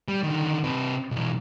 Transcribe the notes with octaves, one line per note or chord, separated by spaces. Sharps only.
G3
D3 D#3
C3 B4
B1 E3